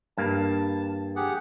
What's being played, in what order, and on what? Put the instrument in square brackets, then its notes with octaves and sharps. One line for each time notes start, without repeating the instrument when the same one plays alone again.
[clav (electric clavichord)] G2 A#3 [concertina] A5
[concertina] G4 G#4 F#5